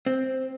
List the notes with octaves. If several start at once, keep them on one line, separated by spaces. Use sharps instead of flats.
C4